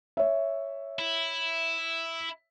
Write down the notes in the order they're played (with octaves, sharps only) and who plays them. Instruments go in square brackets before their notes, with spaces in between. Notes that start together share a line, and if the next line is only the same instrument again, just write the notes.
[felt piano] C#5 E5
[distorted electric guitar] E4